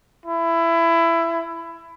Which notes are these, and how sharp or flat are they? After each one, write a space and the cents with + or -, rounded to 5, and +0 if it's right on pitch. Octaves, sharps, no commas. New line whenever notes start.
E4 +20